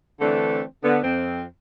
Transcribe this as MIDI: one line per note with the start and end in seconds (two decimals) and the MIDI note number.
0.21 0.62 50
0.21 0.62 52
0.21 0.62 57
0.21 0.62 60
0.21 0.62 62
0.84 0.98 50
0.84 0.98 59
1.03 1.43 41
1.03 1.43 60